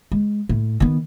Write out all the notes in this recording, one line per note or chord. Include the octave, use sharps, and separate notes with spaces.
G#3
A2
D#3 B3